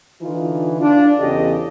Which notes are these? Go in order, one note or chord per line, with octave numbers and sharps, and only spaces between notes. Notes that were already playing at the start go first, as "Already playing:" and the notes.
D3 E3 D#4 F4
D4 F4
E2 C#3 G4 A4 D#5